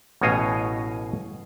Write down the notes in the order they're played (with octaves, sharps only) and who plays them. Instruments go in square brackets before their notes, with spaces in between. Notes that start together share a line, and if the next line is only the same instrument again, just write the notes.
[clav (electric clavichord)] A1 B2 C#5 D#5 F5 G#5